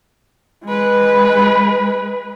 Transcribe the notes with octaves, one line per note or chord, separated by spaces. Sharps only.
G#3 B4